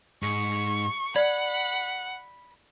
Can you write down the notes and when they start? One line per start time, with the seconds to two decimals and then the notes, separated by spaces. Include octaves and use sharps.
0.23 G#2 C#6
1.16 D5 F#5 B5